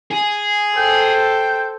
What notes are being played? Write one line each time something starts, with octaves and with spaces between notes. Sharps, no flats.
G#4
A4 C5 G5